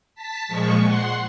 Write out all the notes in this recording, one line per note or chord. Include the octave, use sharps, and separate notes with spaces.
A5 B6
A#2 F3 G#3 C#6
F#5 C6